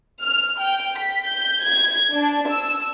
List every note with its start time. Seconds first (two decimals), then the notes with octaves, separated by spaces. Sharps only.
0.23 F6
0.60 G5
0.97 B6
1.27 G6
1.64 G#6
2.14 D4
2.50 E6